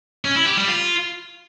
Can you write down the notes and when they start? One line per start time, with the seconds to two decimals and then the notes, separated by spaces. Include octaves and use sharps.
0.25 C#4
0.36 E4
0.46 G4
0.57 G3
0.68 F4